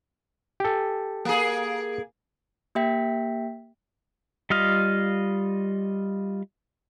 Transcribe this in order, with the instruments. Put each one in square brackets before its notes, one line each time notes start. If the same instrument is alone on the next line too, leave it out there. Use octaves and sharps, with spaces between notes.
[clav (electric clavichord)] G4 A4
[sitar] A#3 G#4
[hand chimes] A#3 G4 E5 G5 B6
[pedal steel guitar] G3 F4 D#5 F5